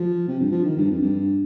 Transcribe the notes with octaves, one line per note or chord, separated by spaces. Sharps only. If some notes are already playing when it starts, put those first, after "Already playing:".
Already playing: F3
C3
G2
F3
D#3
G2
F2
G2